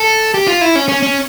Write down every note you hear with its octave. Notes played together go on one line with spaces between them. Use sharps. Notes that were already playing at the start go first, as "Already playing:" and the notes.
Already playing: A4
G4
F4
E4
C#4
C#4
C#4